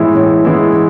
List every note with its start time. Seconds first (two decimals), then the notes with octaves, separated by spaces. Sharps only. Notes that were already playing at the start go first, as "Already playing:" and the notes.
Already playing: A2 E3 G#3 B3 E4
0.15 A2
0.45 E3 G#3 B3 E4